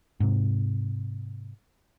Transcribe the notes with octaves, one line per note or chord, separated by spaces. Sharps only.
G#2 C3